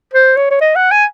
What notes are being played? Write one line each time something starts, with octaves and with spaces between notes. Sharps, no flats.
C5
C#5
C#5
D#5
F#5
G#5